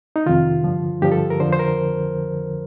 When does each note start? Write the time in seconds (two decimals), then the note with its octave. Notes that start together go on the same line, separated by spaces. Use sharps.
0.16 D#4
0.26 F2 C3 D#3 F4
0.64 G2 D3 F3
1.02 G2 D3 F3 G4
1.12 A4
1.30 A#4
1.40 F2 D3 F3 C5
1.53 C5
1.59 A#4